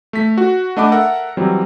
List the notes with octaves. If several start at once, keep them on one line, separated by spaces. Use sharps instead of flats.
A3 B6
F#4
A3 D4 D#5 F#5 B5 D6
A4 A#4 E5 F#5
E3 F#3 G3 C4